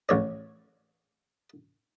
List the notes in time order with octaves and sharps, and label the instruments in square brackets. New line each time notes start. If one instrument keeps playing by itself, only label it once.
[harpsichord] A1 C#5 D5